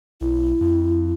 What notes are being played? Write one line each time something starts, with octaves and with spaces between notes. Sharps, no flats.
B1 E4
F2